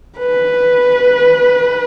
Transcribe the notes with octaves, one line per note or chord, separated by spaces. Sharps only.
B4